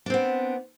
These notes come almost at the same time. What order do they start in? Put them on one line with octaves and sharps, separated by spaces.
D4 C4 B3